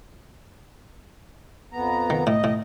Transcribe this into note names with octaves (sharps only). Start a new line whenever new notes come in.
F2 B3 A#5
D#3
A2 D#5
A2